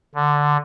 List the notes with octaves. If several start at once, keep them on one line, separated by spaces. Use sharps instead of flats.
D3